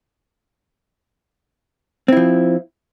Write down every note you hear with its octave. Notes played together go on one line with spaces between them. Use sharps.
F3 C4 E4